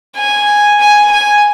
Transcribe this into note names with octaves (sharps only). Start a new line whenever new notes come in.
G#5
G#5
G#5